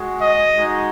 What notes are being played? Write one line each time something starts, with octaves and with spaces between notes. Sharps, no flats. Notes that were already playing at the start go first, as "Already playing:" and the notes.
Already playing: G#3 F#4
D#5
G#3 D#4 F#4